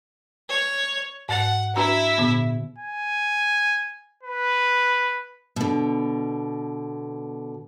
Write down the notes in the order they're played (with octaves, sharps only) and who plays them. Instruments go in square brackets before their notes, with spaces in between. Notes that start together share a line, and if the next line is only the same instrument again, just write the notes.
[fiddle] C#5
[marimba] G#2 A6 [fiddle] F#5
[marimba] D4 F#4 A#5 [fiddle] E4 E5
[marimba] A#2 D3 B3
[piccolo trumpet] G#5
B4
[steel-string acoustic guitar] B2 D3